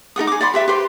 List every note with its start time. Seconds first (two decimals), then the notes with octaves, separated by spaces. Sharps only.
0.16 D#4 A#4 F#5 D#6
0.27 G#4 D6
0.41 D5 F#5 B5 C6
0.54 G4 B4 E5 C6
0.68 G4 B4 C5 C6